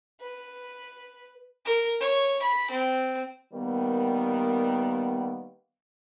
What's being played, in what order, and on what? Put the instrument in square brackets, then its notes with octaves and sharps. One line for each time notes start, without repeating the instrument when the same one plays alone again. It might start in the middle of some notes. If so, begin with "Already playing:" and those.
[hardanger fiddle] B4
[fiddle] A#4
C#5
B5
C4
[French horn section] D#3 G3 A#3 B3